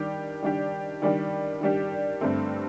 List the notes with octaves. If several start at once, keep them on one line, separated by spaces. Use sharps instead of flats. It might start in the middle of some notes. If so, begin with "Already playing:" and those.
Already playing: D#3 G3 D4 G4
D#3 G3 D4 G4
D#3 G3 D4 G4
D#3 G3 D4 G4
G2 D3 A3 C4